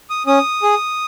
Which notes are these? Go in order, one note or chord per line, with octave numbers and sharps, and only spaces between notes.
D#6
C#4 D#6
G#4